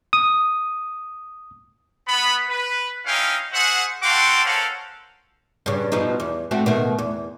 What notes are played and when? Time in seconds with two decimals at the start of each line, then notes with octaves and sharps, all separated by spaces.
0.13 D#6
2.08 B3 B5
2.49 B4
3.06 C#4 D#4 E4 F5 G5 G#5
3.53 F#4 G#4 C5 E5 F#5
4.03 F#4 A4 F5 G5 C6 D6
4.45 C#4 A4 A#4 C5 F5 F#5
5.66 G2 C#3
5.92 B2 F3 D#4
6.20 E2
6.51 A3 C4 F#4
6.66 B2 D#3 A3
6.98 E2